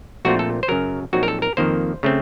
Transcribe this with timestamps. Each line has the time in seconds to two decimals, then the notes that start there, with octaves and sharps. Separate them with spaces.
0.25 A#1 A#2 A3 C4 F4 F#4
0.39 A4
0.63 C5
0.68 F#2 C#3 F#3 A#4
1.13 A#1 A#2 F#3 C4 D#4 F#4
1.23 A#4
1.28 A4
1.42 A#4
1.57 F2 D#3 A#3 C5
2.03 C#3 A3 C4